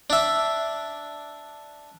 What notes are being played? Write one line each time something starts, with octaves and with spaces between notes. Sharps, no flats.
D4 E5